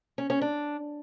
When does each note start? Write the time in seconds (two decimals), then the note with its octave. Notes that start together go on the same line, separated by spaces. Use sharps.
0.18 C#4
0.30 C#4
0.42 D4